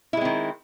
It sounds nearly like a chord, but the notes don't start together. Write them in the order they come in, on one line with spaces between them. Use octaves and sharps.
E4 G#3 C4 D#3